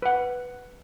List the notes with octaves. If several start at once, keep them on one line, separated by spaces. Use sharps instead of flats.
B4 F#5